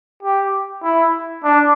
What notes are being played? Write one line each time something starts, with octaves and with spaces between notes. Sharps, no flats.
G4
E4
D4